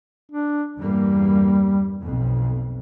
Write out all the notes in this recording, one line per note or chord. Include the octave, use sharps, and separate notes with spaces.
D4
E2 G2 G3 A#3
B1 F2